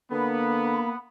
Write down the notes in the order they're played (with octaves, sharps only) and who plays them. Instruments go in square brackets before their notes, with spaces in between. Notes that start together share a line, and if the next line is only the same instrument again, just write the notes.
[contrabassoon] D3 [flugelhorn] A#3 [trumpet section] B3 [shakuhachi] B5